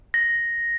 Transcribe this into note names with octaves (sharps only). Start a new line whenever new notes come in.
A#6